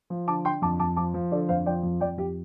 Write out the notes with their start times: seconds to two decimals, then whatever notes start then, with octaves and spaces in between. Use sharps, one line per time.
0.10 F3
0.27 D3 A5 D6
0.45 D3 G5 C6
0.62 F2 A5 D6
0.80 F2 A5 D6
0.96 F3 A5 D6
1.14 F3
1.31 D3 A4 D5
1.49 F2 C5 F5
1.66 F3 D5 G5
1.83 F2
2.00 F2 D5 G5
2.17 F2 G4